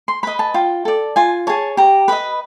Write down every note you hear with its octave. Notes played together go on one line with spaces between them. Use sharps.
C6
B4 D#5 B5
A5
F4 G5
A4 D5
F4 G#5
G#4 C#5 A5
G4 A#5
B4 D#5 B5